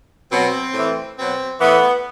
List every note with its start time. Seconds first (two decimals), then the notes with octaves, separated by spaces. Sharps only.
0.30 B2 F#3 C4
0.74 A2
0.79 E3
1.17 B2 F#3 C4
1.60 A2 E3 B3